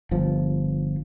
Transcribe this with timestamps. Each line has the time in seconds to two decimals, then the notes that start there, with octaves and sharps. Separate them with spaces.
0.11 G1 F3